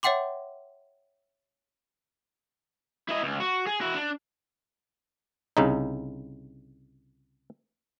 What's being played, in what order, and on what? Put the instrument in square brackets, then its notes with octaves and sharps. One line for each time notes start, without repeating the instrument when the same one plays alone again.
[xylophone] C#5 E5 F#5 G5 C6 D6
[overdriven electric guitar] E4 D#5
C#2
F#4
G#4
E4 F#4
D4
[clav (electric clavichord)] C2 C#3 D#4